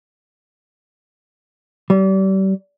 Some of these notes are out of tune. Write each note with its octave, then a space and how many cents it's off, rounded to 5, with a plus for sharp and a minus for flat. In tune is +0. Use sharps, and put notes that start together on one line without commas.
G3 -35